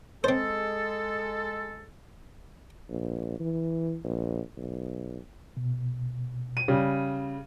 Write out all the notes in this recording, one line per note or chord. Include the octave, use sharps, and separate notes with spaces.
G#3 C4 A4 C5
A#1
E3
A#1
B1
B2
D#7
C#3 G3